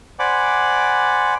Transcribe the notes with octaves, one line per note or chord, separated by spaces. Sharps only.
C5 D5 F#5 G#5 B5 D6